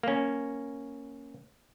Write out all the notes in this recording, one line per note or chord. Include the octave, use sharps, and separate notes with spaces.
A#3 C#4